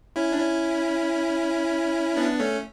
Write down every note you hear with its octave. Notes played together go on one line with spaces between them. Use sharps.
C#4 E4
D4
C#4 E4
B3 D4
A3 C#4